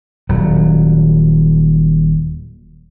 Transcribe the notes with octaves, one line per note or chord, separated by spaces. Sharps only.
D#1 F#3